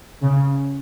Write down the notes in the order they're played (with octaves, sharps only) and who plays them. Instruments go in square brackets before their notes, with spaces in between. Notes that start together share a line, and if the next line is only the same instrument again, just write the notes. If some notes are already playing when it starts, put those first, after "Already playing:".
[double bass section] C#3